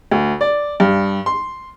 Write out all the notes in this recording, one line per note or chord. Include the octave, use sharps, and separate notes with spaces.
D2
D5
G2
C6